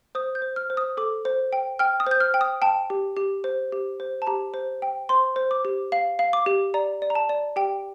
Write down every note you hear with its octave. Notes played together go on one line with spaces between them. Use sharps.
C5 D#6
G6
C5
F6
C5
D#6
A4 D6
C5
G5
G5 F6
D#6
C5 G6
F6
G5
D#6
G5 A5
G4
G4
C5
G4
C5
A5
G4 A#5
C5
G5
C5 C6
C5
D6
G4
F5
F5
D6
G4
D5 A#5
D5
A#5
A5
D5
G4 G5